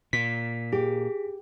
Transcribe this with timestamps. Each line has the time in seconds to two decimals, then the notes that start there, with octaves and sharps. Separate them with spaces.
0.13 A#2 B6
0.72 G4 G#4